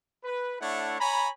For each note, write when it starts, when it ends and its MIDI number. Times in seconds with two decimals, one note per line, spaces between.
0.24 0.59 71
0.61 0.99 57
0.61 0.99 62
0.61 0.99 64
0.61 0.99 73
0.61 0.99 78
1.00 1.29 73
1.00 1.29 80
1.00 1.29 82
1.00 1.29 83